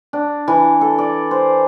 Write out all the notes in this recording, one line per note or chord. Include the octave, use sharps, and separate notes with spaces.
D4
E3
A4
D5
C5